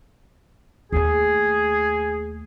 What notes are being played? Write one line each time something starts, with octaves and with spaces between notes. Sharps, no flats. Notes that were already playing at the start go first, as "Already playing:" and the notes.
D#2 A3 G#4